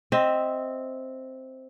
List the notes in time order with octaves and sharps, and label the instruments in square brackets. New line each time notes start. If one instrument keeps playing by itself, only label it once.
[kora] C4 D#5 E5